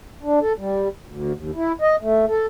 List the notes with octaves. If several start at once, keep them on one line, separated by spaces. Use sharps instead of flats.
D4
A4
G3
D2
D#2
E4
D#5
A3
A4